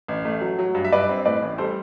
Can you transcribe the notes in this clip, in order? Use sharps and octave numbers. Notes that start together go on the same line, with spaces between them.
A1
A3
F#3
F#3
G2
E5
G2 B4 D5
C4
A2 B4 D5
A1
G3 A4 C5